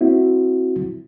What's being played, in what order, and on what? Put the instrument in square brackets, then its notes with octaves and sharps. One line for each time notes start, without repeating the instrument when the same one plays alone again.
[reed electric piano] C4 E4 F#4